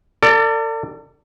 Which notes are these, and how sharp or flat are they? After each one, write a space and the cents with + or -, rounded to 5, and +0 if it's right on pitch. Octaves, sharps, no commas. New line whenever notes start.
A4 +45 D5 +0